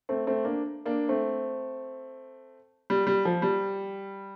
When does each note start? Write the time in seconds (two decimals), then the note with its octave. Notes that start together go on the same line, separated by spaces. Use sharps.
0.09 A3 C4
0.27 A3 C4
0.44 A#3 D4
0.85 A#3 D4
1.09 A3 C4
2.90 G3
3.07 G3
3.25 F3
3.42 G3